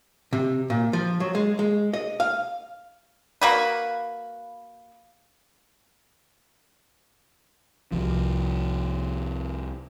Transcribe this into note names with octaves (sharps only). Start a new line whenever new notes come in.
C3
A#2
F3
F#3
G#3
G#3
D#5
F5
A#3 F#4 B4
C2 F3